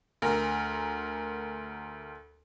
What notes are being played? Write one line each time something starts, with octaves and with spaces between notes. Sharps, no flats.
D2 A#4